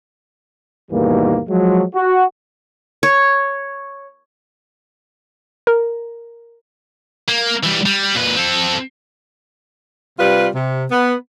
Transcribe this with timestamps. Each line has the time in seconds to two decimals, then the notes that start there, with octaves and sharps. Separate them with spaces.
0.91 D#2 G#2 B2 E3 G3 A#3
1.49 F3 F#3 G#3
1.94 F#4
3.03 C#5
5.67 A#4
7.28 A#3
7.64 E3 G3
7.86 G3
8.15 A#2 B4
8.36 C4 A4
10.19 C3 G3 F4 B4
10.55 C3
10.91 B3